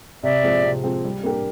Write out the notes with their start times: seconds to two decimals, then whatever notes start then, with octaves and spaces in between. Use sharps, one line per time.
0.23 C3 D5 E5
0.43 F3 G#3 C4
0.64 C3
0.84 F3 G#3 C4
1.04 G3
1.24 A#3 D4 G4 A#4